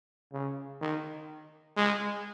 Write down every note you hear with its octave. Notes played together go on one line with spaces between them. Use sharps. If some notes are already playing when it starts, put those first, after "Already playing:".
C#3
D#3
G#3